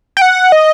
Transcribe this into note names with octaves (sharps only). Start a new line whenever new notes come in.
G5
F#5
D#5